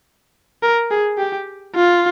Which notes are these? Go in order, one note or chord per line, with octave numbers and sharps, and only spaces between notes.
A#4
G#4
G4
F4